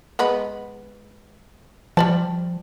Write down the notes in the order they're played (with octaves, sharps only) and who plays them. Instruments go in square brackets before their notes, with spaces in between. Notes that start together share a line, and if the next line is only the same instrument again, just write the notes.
[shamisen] G#3 B3 B4
[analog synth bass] F3 [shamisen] G3 D5 A5